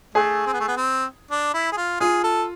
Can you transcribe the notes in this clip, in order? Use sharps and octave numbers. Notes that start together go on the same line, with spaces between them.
A3 G#4
C4
B3
A3
B3
C4
D4
E4
G#4
F4
F4 G#4
A4